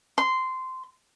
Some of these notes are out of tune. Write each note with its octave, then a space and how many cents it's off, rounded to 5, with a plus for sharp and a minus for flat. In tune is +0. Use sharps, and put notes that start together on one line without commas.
C6 -15